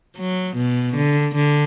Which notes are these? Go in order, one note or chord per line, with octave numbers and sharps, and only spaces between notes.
F#3
B2
D3
D3